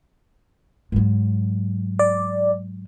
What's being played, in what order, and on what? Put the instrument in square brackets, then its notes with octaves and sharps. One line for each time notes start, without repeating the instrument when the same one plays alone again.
[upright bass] G#2 F#3
[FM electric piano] D5